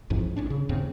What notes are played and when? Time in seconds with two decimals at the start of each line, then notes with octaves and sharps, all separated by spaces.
0.10 A1 F2 G#2 F3
0.37 A1 C#4 D4
0.50 C#3
0.69 D#2 G#2 C#3 C4